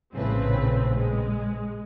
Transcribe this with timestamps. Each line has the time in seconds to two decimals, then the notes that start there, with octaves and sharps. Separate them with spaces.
0.16 A#1 A2 C#3 C4 B4
0.96 G#3